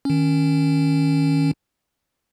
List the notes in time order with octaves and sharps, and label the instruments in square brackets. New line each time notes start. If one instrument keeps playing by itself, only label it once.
[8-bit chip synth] D#3 C#4